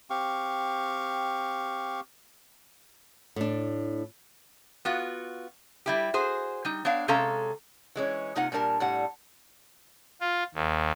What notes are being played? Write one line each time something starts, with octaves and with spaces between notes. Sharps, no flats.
C4 G4 F5 C#6
A2 D4
B3 F4 F#4
G3 E4 G4
F#4 G#4 C5
G3 D#4
B3 D4 C#5 F5
C3 G#3 C#4 A4 F5 A#5
E3 G#3 C#4
C3 A#3 D#4 F4 F#5
A#2 G3 D4 A#4 A5
A2 G3 F#5
F4
D#2